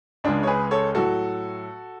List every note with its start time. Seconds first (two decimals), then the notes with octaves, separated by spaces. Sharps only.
0.24 C#2 C#3 G#3 D4
0.43 C#5
0.47 G#4 B4
0.71 A4 C#5
0.95 A2 F#3 F#4 A4